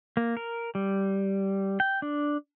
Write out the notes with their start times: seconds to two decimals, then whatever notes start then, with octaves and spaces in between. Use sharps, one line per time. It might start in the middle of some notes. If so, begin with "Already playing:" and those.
0.17 A#3
0.37 A#4
0.75 G3
1.80 G5
2.02 D4